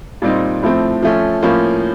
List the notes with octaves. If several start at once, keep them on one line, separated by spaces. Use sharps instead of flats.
A#2 G3 C4 D#4
A2 F3 A3 C4
F3 A3 C#4
A2 F3 A#3 C#4